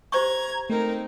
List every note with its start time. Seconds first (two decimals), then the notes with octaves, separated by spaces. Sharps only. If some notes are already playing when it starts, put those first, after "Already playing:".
0.12 G4 C5 A#5 C#6 G#6
0.70 A3 C4 D#4 A#4